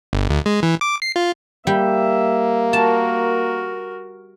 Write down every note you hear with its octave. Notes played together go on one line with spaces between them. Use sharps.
G1
D2
G#3
E3
D6
C7
F4
G3 A#3 E5 G5
F#4 A#4 A5